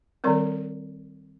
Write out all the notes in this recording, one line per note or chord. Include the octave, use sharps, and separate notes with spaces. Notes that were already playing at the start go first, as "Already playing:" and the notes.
D#3 G3 C4 A#4 D5